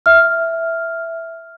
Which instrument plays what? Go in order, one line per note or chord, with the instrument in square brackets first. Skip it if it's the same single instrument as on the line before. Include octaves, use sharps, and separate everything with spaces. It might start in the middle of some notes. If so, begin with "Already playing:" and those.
[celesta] E5 F6